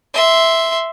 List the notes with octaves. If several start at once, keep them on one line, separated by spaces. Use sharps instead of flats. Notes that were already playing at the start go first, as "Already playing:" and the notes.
E5 C6